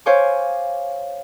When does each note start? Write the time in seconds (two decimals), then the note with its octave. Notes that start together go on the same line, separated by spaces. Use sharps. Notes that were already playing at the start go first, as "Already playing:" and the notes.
0.06 C5 C#5 F5 G#5 D6